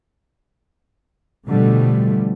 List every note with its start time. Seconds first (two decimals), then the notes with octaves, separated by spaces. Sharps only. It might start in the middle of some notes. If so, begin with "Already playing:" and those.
1.48 B2 D3 F3 G3 A3